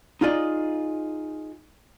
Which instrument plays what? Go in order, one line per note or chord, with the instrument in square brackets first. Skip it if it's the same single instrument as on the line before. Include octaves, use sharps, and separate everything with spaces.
[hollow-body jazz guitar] D#4 F4 G#4 D5 D#5